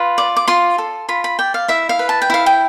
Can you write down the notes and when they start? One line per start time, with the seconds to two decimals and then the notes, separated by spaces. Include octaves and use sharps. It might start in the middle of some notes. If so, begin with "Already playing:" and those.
Already playing: F4 B4
0.18 D5
0.37 D6
0.48 F4 C6
0.78 A4
1.09 F4 B5
1.24 B5
1.39 D5 G5
1.54 F5
1.68 E4 E5
1.89 F5
1.99 B4
2.09 A5
2.22 G5
2.30 E4 F5
2.46 G5